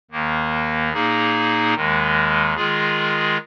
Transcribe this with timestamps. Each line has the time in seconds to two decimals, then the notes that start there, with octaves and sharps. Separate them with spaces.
0.11 D#2 D#3 A#3
0.93 A#2 A#3 D#4 G#4
1.74 D#2 D#3 G#3
2.55 D#3 G#3 F4 G#4